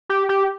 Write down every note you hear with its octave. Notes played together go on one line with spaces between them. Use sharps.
G4
G4